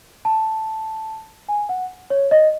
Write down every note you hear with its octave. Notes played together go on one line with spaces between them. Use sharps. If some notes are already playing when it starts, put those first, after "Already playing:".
A5
G#5
F#5
C#5
D#5